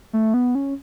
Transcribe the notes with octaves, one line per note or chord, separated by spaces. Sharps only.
A3
B3
C#4